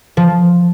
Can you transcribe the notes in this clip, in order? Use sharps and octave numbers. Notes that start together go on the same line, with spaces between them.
F3